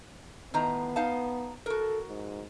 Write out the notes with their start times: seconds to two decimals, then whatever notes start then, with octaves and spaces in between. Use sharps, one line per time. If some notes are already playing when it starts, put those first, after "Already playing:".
0.54 A2 D#3 B3 A#5
0.96 D#4 F5 A5
1.66 F#4 A4 A#4
2.08 G#2